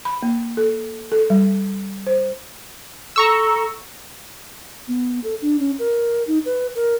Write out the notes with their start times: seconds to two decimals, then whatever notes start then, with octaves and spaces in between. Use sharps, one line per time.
0.05 B5
0.23 A#3
0.57 A4
1.12 A4
1.30 G3
2.07 C5
3.16 A4 A#5 C#6 E6
4.88 B3
5.24 A4
5.42 D4
5.59 C#4
5.79 A#4
6.27 D#4
6.45 B4
6.75 A#4